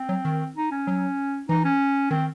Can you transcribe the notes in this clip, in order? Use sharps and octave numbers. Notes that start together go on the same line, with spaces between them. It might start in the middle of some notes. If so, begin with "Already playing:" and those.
Already playing: C4
F#3
D#3
D#4
C#4
F#3
E3 D#4
C#4
D#3 C4